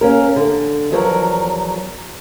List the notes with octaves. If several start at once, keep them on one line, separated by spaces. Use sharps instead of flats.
A#3 C#4 A#4
D3
E2 F3 F#3 A#4